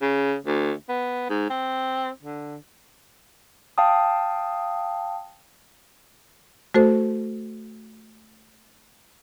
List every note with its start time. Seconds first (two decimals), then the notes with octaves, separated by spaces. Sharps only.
0.02 C#3
0.47 D2
0.89 B3
1.30 G#2
1.50 C4
2.22 D3
3.78 F5 G5 A5 D#6
6.74 A3 F#4 A4 C5